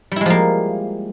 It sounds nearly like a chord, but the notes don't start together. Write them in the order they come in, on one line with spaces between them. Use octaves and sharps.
G3 E4 G#3 F3 A#3